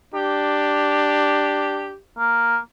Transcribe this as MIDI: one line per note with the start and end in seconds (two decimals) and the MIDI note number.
0.15 1.94 62
0.15 1.97 67
2.18 2.58 58